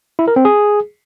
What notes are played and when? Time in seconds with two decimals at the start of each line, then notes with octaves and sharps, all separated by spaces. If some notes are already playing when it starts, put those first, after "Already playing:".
0.19 E4
0.28 A#4
0.36 C4
0.45 G#4